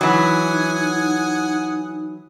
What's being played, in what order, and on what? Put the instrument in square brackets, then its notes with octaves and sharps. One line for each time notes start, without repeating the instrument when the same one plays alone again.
[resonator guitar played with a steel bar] E3 F#3 [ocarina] D#4 [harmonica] F#5 G#5 D#6